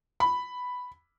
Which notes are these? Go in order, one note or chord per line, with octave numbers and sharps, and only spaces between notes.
B5